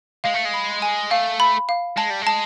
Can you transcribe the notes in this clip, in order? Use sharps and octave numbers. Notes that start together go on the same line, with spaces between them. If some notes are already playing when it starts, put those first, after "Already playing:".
G#3 F5
A3
G#3
B5
G#5
A3 F5
B5
F5
G#3 A5
G3
G#3 A5